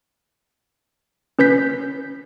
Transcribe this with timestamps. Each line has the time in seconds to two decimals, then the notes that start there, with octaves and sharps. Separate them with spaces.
1.39 C#4 B4 G6 B6